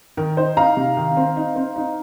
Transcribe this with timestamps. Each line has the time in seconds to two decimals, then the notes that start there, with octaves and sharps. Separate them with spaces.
0.17 D#3 A#4
0.37 D#4 C5
0.57 D#4 F5 A#5
0.77 C3
0.97 D#3
1.17 C4
1.37 D#4
1.56 C4
1.76 D#4